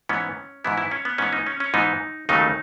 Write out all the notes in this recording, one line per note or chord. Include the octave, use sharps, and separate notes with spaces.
G#2 E3 B3 C#4
G#2 E3 B3 E4
E4
C#4
B3
G#2 E3 B3 C#4
D#4
C#4
C#4
G#2 E3 B3 D#4
D#2 C#3 F#3 A3 D#4